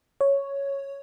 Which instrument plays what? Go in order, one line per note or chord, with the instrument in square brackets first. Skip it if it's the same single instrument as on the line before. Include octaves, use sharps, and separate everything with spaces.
[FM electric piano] C#5